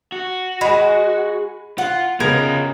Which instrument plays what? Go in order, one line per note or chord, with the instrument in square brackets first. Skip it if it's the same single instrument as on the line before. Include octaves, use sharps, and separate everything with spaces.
[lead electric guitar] F#4
[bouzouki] G#3 [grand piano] G#5 B5
[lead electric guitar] F4 [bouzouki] F#5
[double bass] C#3 [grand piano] G#3 B3 G#6 [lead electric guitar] F4 G4 [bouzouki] A#4